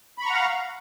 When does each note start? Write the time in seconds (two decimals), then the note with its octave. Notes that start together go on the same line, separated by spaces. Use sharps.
0.18 B5
0.22 C#6
0.26 A#5
0.30 F#5
0.34 F5